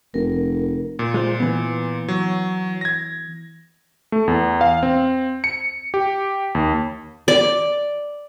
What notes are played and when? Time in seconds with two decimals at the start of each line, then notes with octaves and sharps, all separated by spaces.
0.14 F1 A#4
0.99 A#2
1.14 G#3 F4 C5
1.40 E3 B3
2.08 F#3
2.81 G#6 A#6
4.12 A3
4.28 E2
4.61 F5
4.83 C4
5.44 C#7
5.94 G4
6.55 D#2
7.28 D5